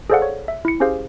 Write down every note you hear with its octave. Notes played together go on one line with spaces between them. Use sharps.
G#4 A4 C5 D5 F5 F#5
C#5
E5
E4 C#7
C#4 G4 G#4 C5 F5